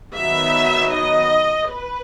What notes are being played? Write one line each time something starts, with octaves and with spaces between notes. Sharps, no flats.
D#3 F#3 B3 E5
D#5
B4